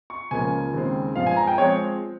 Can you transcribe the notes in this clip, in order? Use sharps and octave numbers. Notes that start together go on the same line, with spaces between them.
C#6
C#2 C#3 F3 A#3 G#5
D#2 C#3 G#3 C4
G2 F3 G#3 C4 F5
G#5
A#5
G5
F3 G#3 C4 C#5